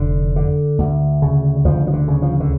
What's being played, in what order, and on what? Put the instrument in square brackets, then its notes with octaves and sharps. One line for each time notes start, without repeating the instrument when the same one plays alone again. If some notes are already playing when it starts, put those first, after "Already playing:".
Already playing: [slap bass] F1 D3
D3
D2
C#3
D2 F3
F3
D3
C#3
F3
D3